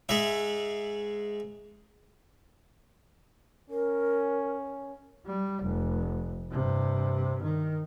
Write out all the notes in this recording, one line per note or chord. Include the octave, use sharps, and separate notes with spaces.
G#2 G#3 E5
C#4 A#4
G3
F1
G2 C3
D#3